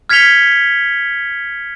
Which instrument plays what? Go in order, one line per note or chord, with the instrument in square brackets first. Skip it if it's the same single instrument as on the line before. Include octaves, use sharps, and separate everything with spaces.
[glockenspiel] F6 G#6 B6 C#7 F7 G7